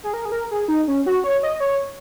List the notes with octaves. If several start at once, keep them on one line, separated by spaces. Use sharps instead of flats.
G#4
A#4
G#4
A#4
G#4
D#4
C#4
F#4
C#5
D#5
C#5